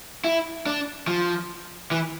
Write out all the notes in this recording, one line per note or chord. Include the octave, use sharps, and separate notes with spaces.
E4
D4
F3
E3